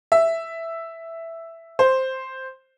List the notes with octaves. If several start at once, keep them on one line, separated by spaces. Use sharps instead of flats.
E5
C5